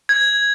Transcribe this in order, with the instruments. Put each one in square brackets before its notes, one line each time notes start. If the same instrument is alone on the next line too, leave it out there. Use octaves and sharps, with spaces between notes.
[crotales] G#6